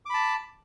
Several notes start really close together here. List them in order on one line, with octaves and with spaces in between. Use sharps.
D6 B5 A5